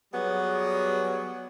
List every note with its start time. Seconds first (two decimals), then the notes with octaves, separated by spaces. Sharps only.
0.13 F#3 G3 B3 G#4